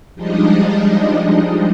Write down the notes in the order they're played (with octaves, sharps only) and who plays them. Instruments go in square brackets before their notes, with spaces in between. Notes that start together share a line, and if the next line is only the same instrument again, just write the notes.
[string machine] F3 G3 G#3 D4 D#4 D#5